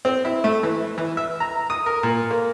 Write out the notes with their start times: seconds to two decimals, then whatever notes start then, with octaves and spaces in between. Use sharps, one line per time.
0.05 C4
0.25 E4
0.44 A3
0.63 E3
0.98 E3
1.17 E5
1.40 A#5
1.70 D#6
1.86 A#4
2.03 A#2
2.31 A#3